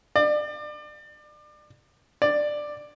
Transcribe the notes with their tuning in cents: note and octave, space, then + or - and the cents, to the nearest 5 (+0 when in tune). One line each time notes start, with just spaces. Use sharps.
D5 +30
D5 +10